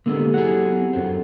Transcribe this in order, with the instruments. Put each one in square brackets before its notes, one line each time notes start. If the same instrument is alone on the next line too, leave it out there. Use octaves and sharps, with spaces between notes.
[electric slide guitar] D3 G#3 B3 [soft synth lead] A#3 [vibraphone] G4 A4 E6
[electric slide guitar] F#3 E4 G#4 [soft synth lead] F#5
[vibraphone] B3 C4 G4
[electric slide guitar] F#2 C4 [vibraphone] D4 F#4 A4